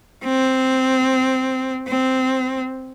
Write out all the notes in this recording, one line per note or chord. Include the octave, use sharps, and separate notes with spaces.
C4
C4